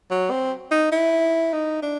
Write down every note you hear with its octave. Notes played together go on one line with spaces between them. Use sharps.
F#3
C4
D#4
E4
D#4
D4